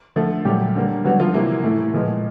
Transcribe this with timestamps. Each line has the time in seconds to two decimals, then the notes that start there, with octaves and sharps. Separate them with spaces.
0.16 D3 F3 A3
0.45 A#2 F#3 G3 A3 G4
0.75 D3 G3 A#3
1.04 D3 F#3 G3 B3 F#4
1.20 F3 F4
1.34 C3 E3 G3 A#3 E4
1.64 A2 E3 A3
1.93 A#2 F3 G#3 B3